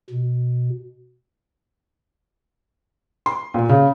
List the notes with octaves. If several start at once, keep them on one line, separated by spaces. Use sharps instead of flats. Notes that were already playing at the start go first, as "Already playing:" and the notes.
B2
C6
A#2
C#3